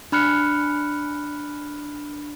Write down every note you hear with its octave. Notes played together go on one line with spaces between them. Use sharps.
D4 B5 F6 F#6 C#7